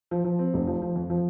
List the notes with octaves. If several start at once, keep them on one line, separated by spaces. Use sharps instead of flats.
F3
F3
C4
F1
F3
F3
F2
F3